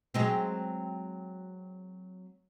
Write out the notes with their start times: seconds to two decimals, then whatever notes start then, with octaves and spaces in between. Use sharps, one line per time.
0.14 F#3 G#3 C4